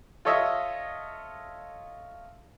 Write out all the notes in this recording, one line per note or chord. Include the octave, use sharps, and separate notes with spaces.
F4 A4 C#5 D#5 E5 E6